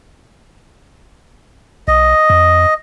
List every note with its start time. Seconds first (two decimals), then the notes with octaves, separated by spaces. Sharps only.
1.88 B1 D#5
2.30 F2